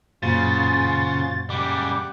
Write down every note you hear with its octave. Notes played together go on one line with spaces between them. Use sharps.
F#2 A#2 C#3 F4 F#4 C5 A6
C#3 G3 G4 F#5 D6